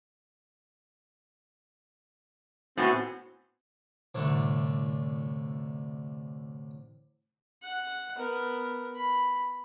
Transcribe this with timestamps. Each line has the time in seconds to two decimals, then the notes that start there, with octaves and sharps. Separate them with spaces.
2.78 A2 B3 C4 F#4 F#5 G#5
4.15 C2 A2 D3
7.62 F#5
8.16 B3 A#4
8.96 B5